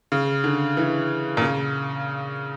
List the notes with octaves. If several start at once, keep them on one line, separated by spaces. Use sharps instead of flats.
C#3
D3
E3
A#2
C#3